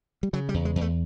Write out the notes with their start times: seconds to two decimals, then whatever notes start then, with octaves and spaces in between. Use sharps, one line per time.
0.23 G3
0.33 C#3 F#3
0.49 G3
0.54 E2
0.65 G#3
0.76 E2
0.81 A3